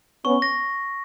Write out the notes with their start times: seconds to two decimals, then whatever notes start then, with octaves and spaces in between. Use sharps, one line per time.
0.25 B3 C#4 C#6
0.42 A#6